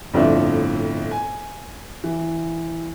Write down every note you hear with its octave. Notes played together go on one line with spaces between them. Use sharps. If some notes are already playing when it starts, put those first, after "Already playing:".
G1 F2 A2 D4 E5
G#5
E3